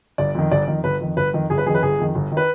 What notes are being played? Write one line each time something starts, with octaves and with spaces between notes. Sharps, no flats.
G1 D5
F2 D#3
G1 D5
F2 D#3
G1 B4
F2 D#3
G1 B4
F2 D#3
G1 G#4
B4
F2 D#3 G#4
B4
G1 G#4
F2 D#3
G1
D#3
B4